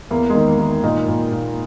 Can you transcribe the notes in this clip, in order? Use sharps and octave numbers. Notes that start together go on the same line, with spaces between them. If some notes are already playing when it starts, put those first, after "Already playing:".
E2 A#3
G#3
D#3
A#3
D#3
A#2 D#4
A#2
A#2